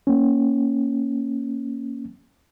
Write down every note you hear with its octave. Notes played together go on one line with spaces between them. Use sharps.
A#3 C#4